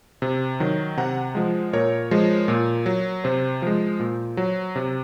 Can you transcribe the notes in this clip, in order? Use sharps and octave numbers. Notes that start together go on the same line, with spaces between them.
C3
D#3 F#3
C3 F#5 A#5
F3 G#3
A#2 A#4 C#5
F3 G#3
A#2
F#3
C3 C5
F3 G#3
A#2
F#3
C3